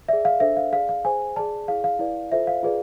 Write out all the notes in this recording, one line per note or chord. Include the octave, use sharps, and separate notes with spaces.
G#4 D5 E5
F5
D4 A4 C5 E5
F5
G#4 D5 F5
F5
G#4 C5 G#5
G#4 D5 A5
E4 G#4 D5 F5
F5
E4 B4 D5
F4 A4 C5 E5
F5
F4 G#4 B4 D5